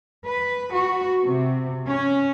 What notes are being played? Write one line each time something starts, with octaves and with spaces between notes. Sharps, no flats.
B4
F#4
C3
C#4